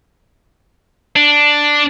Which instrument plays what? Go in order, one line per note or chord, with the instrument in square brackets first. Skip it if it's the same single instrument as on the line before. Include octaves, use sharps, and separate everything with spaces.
[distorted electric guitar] D4